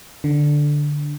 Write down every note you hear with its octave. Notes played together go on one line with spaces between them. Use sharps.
D3